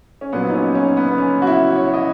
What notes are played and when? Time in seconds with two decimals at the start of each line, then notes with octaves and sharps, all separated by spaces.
0.21 C#4
0.32 A#1 A#2 F#3 B3
0.50 D#4
0.54 C#4
0.75 C#4
0.97 B3
1.08 B3
1.18 C#4
1.42 F#4
1.47 E4
1.75 C#5
1.94 D#5